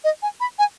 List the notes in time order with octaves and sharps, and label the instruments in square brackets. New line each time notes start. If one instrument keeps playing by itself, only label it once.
[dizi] D#5
G#5
B5
G#5